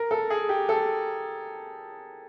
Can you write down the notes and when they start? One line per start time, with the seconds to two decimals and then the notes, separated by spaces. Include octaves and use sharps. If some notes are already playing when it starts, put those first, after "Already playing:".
Already playing: A#4
0.11 A4
0.30 G#4
0.49 G4
0.69 A4